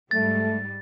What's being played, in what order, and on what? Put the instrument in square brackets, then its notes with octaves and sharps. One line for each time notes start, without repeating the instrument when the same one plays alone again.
[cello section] G#2 G3 [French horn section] A3 [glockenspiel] A6